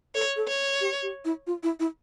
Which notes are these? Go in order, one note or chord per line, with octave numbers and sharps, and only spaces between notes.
A4 C#5
A4
C#5
G4
G4
E4
F4
E4
E4